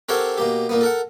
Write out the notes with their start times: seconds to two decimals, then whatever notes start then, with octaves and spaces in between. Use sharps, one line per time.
0.09 C4 G4 A4 A#4 C#5 F#5
0.38 B2 A#3 G4
0.69 A#2 A#3 B3
0.81 A4 A#4 F#5